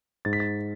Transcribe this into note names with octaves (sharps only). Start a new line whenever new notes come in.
G#2 A6
B6
A6